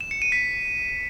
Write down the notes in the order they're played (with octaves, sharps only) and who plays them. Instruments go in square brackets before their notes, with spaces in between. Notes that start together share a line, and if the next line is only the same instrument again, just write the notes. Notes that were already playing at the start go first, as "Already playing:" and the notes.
[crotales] E7
C#7
D#7
B6